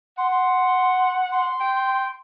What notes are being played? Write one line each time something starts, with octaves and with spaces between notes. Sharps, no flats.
F#5 C6
C6
C6
G5